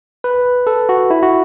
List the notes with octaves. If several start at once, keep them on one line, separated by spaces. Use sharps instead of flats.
B4
A4
F#4
E4
F#4